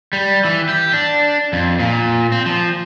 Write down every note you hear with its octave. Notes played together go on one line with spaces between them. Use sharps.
G3
E3
G4
D4
F2
A#2
C4
F3